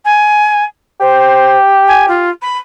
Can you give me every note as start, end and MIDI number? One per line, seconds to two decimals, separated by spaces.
0.05 0.64 80
1.00 2.30 67
1.00 1.56 72
1.87 2.05 80
2.08 2.29 65
2.41 2.57 83